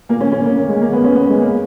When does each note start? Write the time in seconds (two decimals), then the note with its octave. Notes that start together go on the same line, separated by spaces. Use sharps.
0.09 A#2 A#3
0.21 C#4
0.32 C#4
0.45 A#3
0.57 A#3
0.68 G#3
0.81 A#3
0.92 B3
1.04 C#4
1.16 B3
1.29 G#3
1.41 A#3